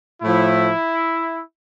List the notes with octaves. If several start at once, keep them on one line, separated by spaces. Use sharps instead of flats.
A2 F3 E4